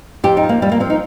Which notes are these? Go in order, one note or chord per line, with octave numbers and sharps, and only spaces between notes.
F2 G4
D#4
F3
A#3
F2 G3
A#3
F3 C4
D#4